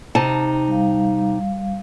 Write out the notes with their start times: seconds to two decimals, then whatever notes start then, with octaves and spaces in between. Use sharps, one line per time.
0.15 C3 D#4 A5
0.68 G3 F5